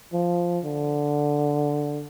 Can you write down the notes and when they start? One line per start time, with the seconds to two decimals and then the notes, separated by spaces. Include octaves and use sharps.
0.13 F3
0.65 D3